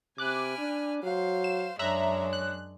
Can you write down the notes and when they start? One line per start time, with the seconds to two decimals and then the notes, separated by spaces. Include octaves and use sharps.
0.18 C3 G#5 B5 D6 F6 F#6
0.58 D4
1.03 F#3 C5 F5
1.44 E7
1.79 F#2 G#3 D4 C#5 E5 A#5 F#6
2.33 F#6